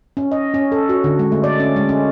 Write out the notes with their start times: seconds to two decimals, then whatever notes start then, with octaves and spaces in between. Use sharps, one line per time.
0.17 C#4
0.32 D#5
0.54 C#4
0.72 A4
0.89 F#4
1.04 D3
1.19 G#3
1.32 A3
1.44 D5
1.60 C#4
1.76 G#3
1.89 C#4